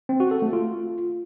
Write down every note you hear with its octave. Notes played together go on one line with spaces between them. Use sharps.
C4
F#4
A4
A3
F4